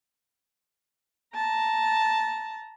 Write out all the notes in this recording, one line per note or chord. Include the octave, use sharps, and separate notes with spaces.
A5 A#5